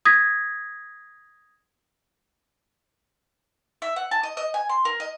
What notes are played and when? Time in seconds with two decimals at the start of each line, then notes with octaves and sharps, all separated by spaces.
0.05 D#6 G#6 A#6 B6
3.82 E5
3.96 F#5
4.11 A5
4.23 D#5
4.37 D#5
4.54 G#5
4.69 C6
4.85 A#4
5.00 D#5